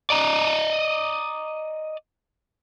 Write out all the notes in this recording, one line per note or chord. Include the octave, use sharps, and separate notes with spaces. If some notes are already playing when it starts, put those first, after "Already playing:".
D5 D#5 A#5